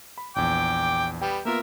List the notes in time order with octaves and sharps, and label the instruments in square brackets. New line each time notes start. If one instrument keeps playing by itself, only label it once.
[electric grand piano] B5
[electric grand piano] A#1 E2 [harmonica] G5 D6
[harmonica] G3 B3 [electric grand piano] G5
[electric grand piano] A#3 B3 F4 [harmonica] A#4 E5